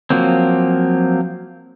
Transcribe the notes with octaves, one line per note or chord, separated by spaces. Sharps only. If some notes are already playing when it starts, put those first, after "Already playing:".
F3 F#3 A#3 C4